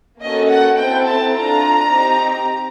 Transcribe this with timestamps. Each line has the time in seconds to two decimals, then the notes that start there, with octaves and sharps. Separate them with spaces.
0.21 A#3 C#4 F#4 A4 D#5
0.50 F#5
0.77 C4 E4 A4 G5
1.06 A5
1.34 D4 F4 A4 A#5
1.90 C4 D#4 G4